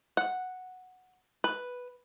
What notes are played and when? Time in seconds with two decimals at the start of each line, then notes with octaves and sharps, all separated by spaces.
0.17 F#5
1.44 B4